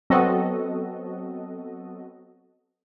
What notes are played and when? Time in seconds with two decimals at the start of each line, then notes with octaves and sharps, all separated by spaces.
0.10 F#3 B3 C4 F#4 A4 D#5